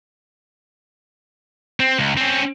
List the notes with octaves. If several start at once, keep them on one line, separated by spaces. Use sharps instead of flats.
C4
C#2
C4 C#4